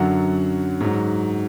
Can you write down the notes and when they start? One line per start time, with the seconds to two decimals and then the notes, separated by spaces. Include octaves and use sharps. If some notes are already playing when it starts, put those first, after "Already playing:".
Already playing: F#2 D3 F#3 F#5
0.80 G#2 F#3